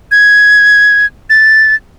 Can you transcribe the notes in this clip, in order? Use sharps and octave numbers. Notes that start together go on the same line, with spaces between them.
G#6
A6